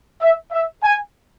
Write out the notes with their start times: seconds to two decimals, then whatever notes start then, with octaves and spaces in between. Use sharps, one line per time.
0.21 E5
0.52 E5
0.83 G#5